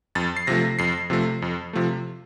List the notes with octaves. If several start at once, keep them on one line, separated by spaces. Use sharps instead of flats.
F2 A6
C7
C3 F3 A3 A#6
F2 C7
C3 F3 A3
F2
C3 F3 A3